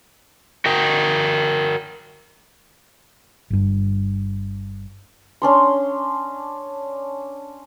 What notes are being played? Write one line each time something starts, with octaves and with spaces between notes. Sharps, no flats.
F#4 A#4 G5
G1 G2
C#4 D4 C6